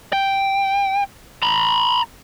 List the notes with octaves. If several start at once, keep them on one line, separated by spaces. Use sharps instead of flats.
G5
A#5 B5